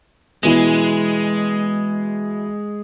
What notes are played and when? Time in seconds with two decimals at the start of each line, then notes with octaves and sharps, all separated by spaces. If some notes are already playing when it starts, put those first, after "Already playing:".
0.43 B2 E3 G#3 E4